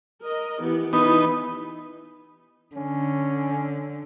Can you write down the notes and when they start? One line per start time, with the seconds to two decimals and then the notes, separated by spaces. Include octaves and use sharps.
0.22 A#4 D#5
0.60 E3 B3 G4
0.93 E3 B3 D#4
2.76 D3 C#4